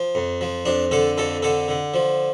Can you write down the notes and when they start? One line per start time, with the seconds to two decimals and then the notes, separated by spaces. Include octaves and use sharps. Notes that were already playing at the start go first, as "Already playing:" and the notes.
Already playing: F3
0.15 F2
0.41 F3
0.65 F2 D4
0.91 D3 A4
1.17 F2 A4
1.42 D3 A4
1.68 D3
1.94 F3